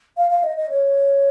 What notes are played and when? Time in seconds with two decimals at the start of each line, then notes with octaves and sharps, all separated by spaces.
0.17 F5
0.30 F5
0.43 D#5
0.57 D#5
0.70 C#5